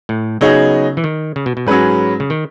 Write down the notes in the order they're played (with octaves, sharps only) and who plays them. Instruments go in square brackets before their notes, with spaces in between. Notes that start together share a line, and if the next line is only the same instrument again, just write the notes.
[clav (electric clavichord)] A2
[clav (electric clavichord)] C#3 [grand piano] F#3 B3 D#4 G#4 C#5
[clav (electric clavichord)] E3
D#3
C#3
B2
B2
[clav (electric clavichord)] G#2 [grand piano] F#3 C#4 G#4 B4
[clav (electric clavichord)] C#3
D#3